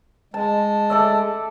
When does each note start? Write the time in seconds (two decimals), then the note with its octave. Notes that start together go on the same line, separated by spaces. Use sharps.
0.34 G#3 A5
0.90 A4 D5 E5